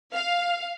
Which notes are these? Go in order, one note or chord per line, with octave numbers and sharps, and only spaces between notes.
F5